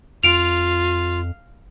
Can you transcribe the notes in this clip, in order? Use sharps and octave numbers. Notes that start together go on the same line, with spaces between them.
F2 F4 F5 D7 F7